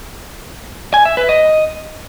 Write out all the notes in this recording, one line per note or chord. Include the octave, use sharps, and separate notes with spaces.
G#5
E5
B4
D#5